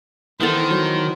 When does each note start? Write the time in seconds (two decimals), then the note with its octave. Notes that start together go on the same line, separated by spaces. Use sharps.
0.40 D#3 E3 B3 A4 C5
0.70 F#3